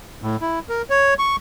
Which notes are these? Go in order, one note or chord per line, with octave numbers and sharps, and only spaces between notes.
A2
E4
A#4
C#5
C#6